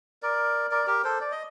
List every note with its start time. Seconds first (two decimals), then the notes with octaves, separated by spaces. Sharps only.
0.22 A#4 D5
0.71 A#4 D5
0.87 G4 A#4
1.04 A4 C5
1.21 D5
1.32 D#5